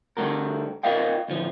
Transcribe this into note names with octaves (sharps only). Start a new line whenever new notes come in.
D3 G3 A3 F#4 A#4
F4 A#4 D5 D#5 F5 G5
D2 A2 F3